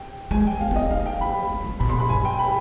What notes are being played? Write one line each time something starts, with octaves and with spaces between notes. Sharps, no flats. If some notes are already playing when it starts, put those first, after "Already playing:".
Already playing: G5
G#3 G#5
G5
B3 F5
B3
D#5
C4
D#4 F5
G5
D4 B5
C4
G3
B2 B5
C6
B5
G2 G#5
G5
B5